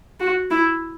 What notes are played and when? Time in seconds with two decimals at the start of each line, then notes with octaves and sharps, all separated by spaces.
0.20 F#4
0.51 E4